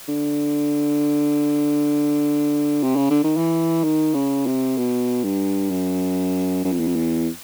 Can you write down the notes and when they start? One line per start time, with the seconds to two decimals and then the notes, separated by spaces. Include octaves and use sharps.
0.09 D3
2.83 C3
2.96 C#3
3.10 D3
3.24 D#3
3.37 E3
3.84 D#3
4.14 C#3
4.46 C3
4.78 B2
5.24 G2
5.71 F#2
6.64 F#2
6.72 F2
6.80 E2
6.87 F2
6.96 E2